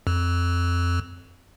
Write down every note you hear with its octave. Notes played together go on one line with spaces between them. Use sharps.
F2